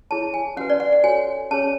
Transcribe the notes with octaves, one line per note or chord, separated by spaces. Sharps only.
E4 G#4 C#5 A5
G#5
C#4 F#4 B4 F#5
D5
F#5
F#5
F#4 A4 C#5 G#5
C#4 G#4 C#5 A5